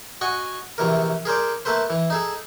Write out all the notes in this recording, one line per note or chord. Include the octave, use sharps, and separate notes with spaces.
F#4 D#5 F#5 G#5
A#1 C3 E3 A#4
G#4 A#4 C5 D5
A3 A#3 A4 B4 C5
E3
D#4 G#4 A4